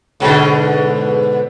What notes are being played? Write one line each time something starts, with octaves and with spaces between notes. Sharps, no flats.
G#2 B2 D3